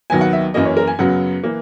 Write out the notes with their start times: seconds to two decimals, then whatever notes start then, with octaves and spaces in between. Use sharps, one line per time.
0.10 D#2 D#3 F#3 B3 G#5
0.21 F#5
0.33 E5
0.54 F#2 E3 A#3 D#5
0.65 C#5
0.77 A#4
0.87 G#5
0.99 F#2 C#3 F#3 B3 F#5
1.44 E3 A#3